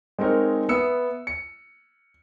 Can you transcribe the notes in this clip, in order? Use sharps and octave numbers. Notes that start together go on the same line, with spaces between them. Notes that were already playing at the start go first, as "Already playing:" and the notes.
G#3 C4 D#4 A#4 C#5
B3 E5 D#6 E6 C#7
C#7